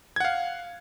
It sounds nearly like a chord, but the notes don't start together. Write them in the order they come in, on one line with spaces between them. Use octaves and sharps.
G#6 F#5 F5